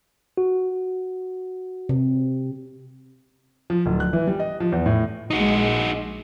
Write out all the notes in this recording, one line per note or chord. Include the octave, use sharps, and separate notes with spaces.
F#4
C3
F3
D1
F#6
E3
G3
D#5
F3
E2
A2
A#1 G#3 D#4 F#4